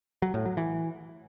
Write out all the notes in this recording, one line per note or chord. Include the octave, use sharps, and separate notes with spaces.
F#3
A2
F#3
E3